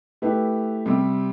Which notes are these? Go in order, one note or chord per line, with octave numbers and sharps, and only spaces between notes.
A3 E4 G4 B4
C3 G3 C4